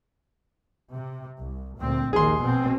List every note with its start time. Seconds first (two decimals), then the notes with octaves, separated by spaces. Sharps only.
0.92 C3
1.41 C2
1.79 D2 A#2 C4
2.13 A#1 D#2 D#3 G#4 C6
2.42 B2 C4